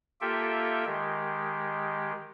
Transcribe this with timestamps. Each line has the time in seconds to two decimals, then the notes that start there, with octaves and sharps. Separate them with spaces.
0.21 A#3 F4 G4 A4 E5 G5
0.86 D#3 G#3 G4